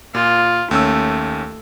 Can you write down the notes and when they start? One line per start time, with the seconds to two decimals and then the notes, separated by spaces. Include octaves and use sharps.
0.15 A#2 F4
0.71 D#2 A3 C#4 E6